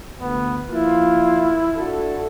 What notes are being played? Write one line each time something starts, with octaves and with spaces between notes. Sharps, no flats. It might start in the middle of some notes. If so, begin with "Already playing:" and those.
D2 B3
F3 A#3 E4 F4
D4 F#4 A4